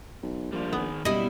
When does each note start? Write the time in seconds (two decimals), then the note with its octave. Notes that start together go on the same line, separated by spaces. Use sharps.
0.22 B1
0.52 A#1 G3 F4
0.73 D#3 B3 G#4
1.05 F#1 B2 G3 E4 D#5